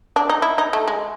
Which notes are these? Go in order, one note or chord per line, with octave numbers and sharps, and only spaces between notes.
D4
D#4
E4
D#4
A3
G#3